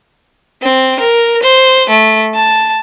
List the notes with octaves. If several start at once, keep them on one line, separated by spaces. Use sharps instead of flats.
C4
A#4
C5
A3
A5